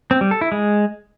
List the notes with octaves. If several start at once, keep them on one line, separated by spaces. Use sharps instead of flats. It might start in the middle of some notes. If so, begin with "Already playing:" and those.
C4
G3
A4
E4
G#3